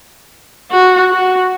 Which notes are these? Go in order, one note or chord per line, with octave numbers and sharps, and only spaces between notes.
F#4
F#4